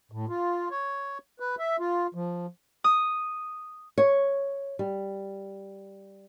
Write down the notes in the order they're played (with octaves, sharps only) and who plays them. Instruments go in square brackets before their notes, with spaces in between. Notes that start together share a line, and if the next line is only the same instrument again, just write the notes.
[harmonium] A2
F4
C#5
B4
E5
F4
F3
[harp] D#6
[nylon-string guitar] C#5
G3